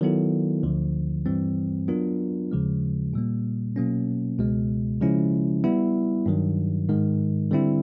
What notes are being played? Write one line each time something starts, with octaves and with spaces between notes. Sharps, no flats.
D#3 F#3 B3 E4 A4
D2 D3 F3
G2 E3 G3 C4
F#3 B3 D4 F4 A#4
D#2 C#3 F3 G#3
A#2 G3 A#3
B2 F#3 A#3 C#4
C#2 B2 G#3
C#3 F3 G#3 C#4 E4
G3 B3 E4
G2 D#3 F#3
G#2 D#3 G#3
D3 G3 C4 E4